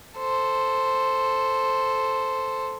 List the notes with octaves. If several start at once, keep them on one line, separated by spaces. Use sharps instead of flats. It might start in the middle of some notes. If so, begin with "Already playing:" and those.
A4 C5